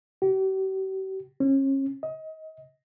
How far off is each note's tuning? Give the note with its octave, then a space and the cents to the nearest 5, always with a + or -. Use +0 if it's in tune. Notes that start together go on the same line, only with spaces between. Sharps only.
G4 -45
C#4 -35
D#5 +30